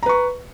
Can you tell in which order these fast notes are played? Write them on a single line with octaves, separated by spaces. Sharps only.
A#5 B4 C#6